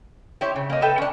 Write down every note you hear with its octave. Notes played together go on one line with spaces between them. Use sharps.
E4 G4 C5 C#5
C#3
A#3 D#4
A4 B4 E5 G5
C#4 D4